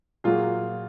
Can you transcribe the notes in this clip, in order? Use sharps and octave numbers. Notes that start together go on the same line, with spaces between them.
A#2 F#3 A#3 F4 G#4